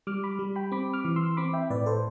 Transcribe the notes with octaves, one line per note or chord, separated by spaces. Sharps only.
G3 D6 F6
B5 D6
G3
G5 B5
C4 B5 D6
D6 F6
E3
C6 E6
C4 B5 D6
E5 G5
A2 B4 D5
A4 C5